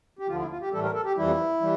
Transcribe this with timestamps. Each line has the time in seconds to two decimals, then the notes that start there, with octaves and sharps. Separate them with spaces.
0.19 G4
0.28 D2 D3 F3 F4
0.39 E4
0.50 F4
0.62 G4
0.72 A2 E3 G3 A4
0.83 A#4
0.94 A4
1.05 G4
1.16 F2 E3 G3 E4
1.61 E3 G3